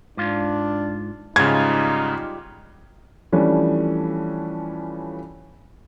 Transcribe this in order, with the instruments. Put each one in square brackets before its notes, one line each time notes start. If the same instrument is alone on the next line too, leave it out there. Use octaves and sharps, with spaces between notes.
[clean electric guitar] G#2 F4 [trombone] D4
[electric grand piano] G#2 C#3 [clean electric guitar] G3 F4 [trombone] D#4 [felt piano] G#6
[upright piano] E3 F3 G3 A3 C#4 D4